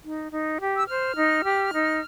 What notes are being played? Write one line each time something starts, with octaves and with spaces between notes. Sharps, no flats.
D#4
D#4
G4
E6
C5 F6
D#4
G4
D#4